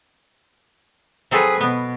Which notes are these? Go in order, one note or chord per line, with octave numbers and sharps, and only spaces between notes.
F#3 C4 G#4 A4 B4
B2 B3